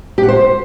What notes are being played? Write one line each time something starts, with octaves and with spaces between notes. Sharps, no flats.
G4
F#5
C5